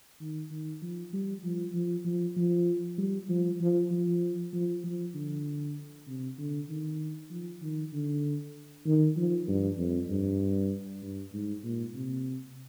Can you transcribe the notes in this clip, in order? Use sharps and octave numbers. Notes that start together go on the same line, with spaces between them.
D#3
D#3
F3
G3
F3
F3
F3
F3
G3
F3
F3
F3
F3
F3
D3
C3
D3
D#3
F3
D#3
D3
D#3
F3
G2
F2
G2
G2
G#2
A#2
C3